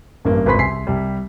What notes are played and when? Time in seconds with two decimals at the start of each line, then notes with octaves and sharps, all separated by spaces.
0.25 A1 G2 A#3
0.46 G#1 C#2 B4 B5 C6 B6
0.58 C2 G#5 C6 B6 C7
0.87 C2 G3